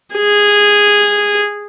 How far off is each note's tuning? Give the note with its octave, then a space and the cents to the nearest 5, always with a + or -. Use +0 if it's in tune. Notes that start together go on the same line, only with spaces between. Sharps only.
G#4 -10